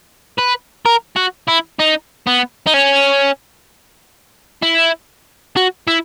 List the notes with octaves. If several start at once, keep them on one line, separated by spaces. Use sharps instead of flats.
B4
A#4
F#4
E4
D#4
B3
D#4
C#4
E4
F#4
E4